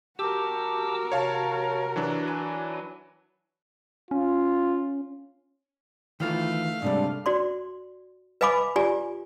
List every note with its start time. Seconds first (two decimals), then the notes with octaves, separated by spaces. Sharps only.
0.19 F#4 G4 A#4 A5 D6 E6
1.12 C3 C#5 F5 A5
1.96 E3 F#3 D4
2.28 E4 G#5
4.11 C#4 F4
6.20 D#3 E3 A3 F4 F5
6.82 G#2 C3 G3 D4
7.26 F#4 D5 C6
8.41 B4 D#5 F5 G#5 B5 D6
8.76 F4 G4 D5 G#5